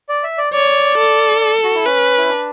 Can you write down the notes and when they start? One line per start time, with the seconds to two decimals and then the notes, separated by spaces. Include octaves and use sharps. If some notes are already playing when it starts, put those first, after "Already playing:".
0.09 D5
0.23 E5
0.38 D5
0.53 C#5 D5
0.98 A4
1.41 D5
1.64 F#4
1.75 E4
1.85 C#4 B4
2.18 E4
2.29 D4